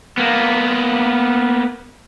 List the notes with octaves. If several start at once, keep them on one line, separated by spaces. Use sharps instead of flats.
A#3 B3